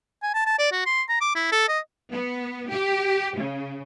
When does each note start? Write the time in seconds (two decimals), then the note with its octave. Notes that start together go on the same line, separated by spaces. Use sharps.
0.23 G#5
0.34 A5
0.46 A5
0.59 D5
0.72 F#4
0.86 C6
1.09 A#5
1.21 D6
1.35 E4
1.52 A4
1.69 D#5
2.09 B3
2.70 G4
3.37 C#3